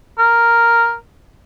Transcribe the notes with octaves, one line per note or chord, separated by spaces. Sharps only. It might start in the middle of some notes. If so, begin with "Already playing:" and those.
A#4